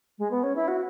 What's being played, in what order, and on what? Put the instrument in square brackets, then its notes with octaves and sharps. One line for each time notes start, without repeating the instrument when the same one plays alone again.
[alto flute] G#3
B3
C#4
E4
F#4